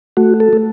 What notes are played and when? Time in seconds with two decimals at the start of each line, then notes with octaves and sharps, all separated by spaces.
0.17 A3 F#4
0.40 A4
0.53 A3